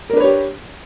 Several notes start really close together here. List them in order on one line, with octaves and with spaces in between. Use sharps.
A#4 D4 B4 C#5 G4